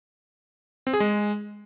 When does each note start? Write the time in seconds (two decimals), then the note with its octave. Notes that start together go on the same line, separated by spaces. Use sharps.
0.87 C4
0.93 G#4
1.00 G#3